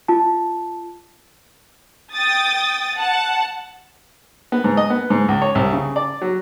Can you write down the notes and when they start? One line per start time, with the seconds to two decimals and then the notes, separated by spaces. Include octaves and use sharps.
0.08 F4 A5
2.14 G5 D#6 A6
2.96 F#5 A5
4.52 B3
4.64 G#2
4.77 D#5
4.90 B3
5.10 G#2
5.28 C#2
5.42 C#5
5.55 C2
5.73 C#3
5.96 D5
6.21 F#3